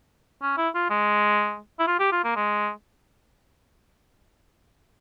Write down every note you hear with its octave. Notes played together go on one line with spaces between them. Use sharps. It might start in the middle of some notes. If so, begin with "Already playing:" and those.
C#4
E4
F4
G#3
E4
F4
G4
F4
A#3
G#3